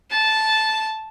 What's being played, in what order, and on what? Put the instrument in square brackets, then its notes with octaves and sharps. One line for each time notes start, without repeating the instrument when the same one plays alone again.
[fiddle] A5